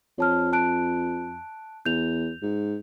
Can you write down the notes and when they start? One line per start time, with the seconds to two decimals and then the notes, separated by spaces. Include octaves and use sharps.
0.18 F2 C#5 A5 F6
0.53 A5 F#6 D7
1.86 E2 G6 F7
2.42 G#2